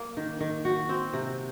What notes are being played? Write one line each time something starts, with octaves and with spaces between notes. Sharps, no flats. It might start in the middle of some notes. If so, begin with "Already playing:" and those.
Already playing: A#3
D#3
D#3
F#4
C4
C3